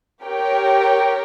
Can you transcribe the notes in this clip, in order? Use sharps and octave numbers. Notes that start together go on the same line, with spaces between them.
G4 A#4 C#5 G5